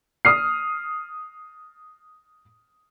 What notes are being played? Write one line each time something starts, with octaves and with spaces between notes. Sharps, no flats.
D#6 F6 C7